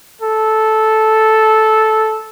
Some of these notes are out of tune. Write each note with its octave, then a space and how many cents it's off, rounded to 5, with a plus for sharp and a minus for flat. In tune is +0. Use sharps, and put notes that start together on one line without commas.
A4 -10